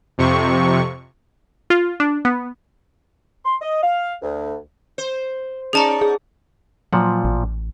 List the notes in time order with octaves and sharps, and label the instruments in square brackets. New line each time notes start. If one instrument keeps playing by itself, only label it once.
[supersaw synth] F2 C3 C#6
[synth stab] F4
D4
B3
[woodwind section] C6
D#5
F5
D2
[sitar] C5
[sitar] C#4 D#4 D5 [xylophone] G#4 A5 A#5
[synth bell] G#4
[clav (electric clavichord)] A#2 F3 F#5 [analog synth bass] F#3
[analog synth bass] A1